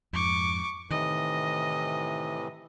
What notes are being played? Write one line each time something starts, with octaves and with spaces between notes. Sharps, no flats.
F2 G#2 C#6 D6
A2 C3 D#3 E3 D#5